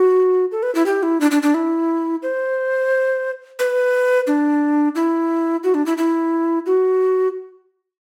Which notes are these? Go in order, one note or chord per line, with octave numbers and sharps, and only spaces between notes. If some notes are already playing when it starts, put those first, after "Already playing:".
Already playing: F#4
A4
B4
E4
G4
E4
D4
D4
D4
E4
C5
B4
D4
E4
F#4
D4
E4
E4
F#4